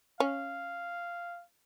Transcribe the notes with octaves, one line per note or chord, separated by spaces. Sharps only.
C#4 F5